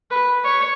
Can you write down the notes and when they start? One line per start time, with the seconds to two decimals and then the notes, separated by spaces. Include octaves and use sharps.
0.11 B4
0.45 C#5